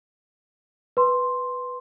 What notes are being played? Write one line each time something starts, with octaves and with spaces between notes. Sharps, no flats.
B4 C6